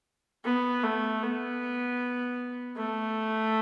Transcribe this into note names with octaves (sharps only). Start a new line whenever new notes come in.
B3
A3
B3
A3